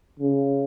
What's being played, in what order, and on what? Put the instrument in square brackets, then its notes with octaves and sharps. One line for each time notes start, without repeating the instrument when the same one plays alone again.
[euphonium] C#3